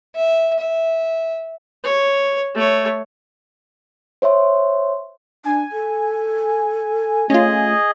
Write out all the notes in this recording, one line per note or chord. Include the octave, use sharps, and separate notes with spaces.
E5
E5
C#5
A3 C#5
C5 C#5 E5 C6
D4 G#5
A4
A3 C#4 F4 G#4 D#5